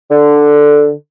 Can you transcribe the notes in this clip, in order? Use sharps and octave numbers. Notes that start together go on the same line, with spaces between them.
D3